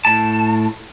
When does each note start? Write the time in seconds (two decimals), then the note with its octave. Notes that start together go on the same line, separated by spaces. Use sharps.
0.05 A2 A5